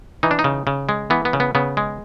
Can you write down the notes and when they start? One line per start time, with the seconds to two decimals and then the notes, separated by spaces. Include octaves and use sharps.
0.23 E3 D#4
0.31 D4
0.39 D#4
0.44 C#3
0.67 C#3
0.89 G#3
1.10 E3 B3
1.25 B3
1.33 C#3
1.40 B3
1.55 C#3 B3
1.77 G#3